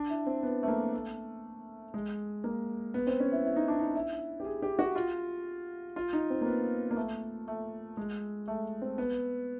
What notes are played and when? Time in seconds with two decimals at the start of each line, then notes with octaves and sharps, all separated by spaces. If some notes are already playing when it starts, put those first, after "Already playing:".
Already playing: D4
0.10 E4
0.27 C4
0.43 B3
0.63 A3
0.68 A#3
0.93 A3
1.94 G#3
2.44 A#3
2.94 B3
3.07 C4
3.20 C#4
3.32 E4
3.45 E4
3.56 D#4
3.68 D4
3.79 D#4
3.96 E4
4.40 G4
4.45 G#4
4.62 G4
4.79 F#4
4.96 F4
5.96 F4
6.13 D#4
6.30 C4
6.41 A#3
6.46 B3
6.91 A#3
6.97 A3
7.48 A3
7.97 G#3
8.48 A3
8.82 C4
8.98 B3